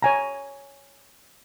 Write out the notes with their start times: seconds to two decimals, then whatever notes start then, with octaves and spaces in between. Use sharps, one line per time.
0.02 C#5 G#5 A#5